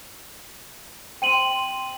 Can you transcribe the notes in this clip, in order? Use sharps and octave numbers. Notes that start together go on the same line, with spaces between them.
C4 G5 C6 D#7 F#7